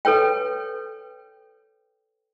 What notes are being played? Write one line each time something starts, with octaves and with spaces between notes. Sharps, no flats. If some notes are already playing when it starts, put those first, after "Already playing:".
A4 B4 C#5 G5